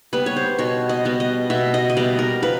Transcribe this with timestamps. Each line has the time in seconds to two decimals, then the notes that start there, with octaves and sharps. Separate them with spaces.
0.13 G3 B3 B4
0.26 C#5
0.36 C5
0.58 B2 C#5
0.89 D#5
1.05 G3 B3
1.20 D#5
1.50 B2 E5
1.74 D#5
1.90 D#5
1.97 G3 B3 D5
2.19 A#4
2.42 F3 B4